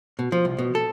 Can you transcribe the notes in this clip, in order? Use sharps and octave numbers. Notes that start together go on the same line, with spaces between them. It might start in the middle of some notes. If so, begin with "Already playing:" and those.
B2
F3
C2
B2
A4